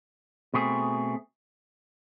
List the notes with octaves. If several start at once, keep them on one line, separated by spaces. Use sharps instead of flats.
B2 A3 C4 G#4